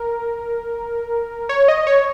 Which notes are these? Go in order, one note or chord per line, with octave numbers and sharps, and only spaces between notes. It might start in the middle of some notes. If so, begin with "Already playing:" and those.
Already playing: A#4
C#5
D#5
C#5